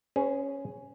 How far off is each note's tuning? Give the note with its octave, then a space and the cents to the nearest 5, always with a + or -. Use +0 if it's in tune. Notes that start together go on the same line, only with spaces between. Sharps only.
C#4 +0 G#4 +0 C5 -45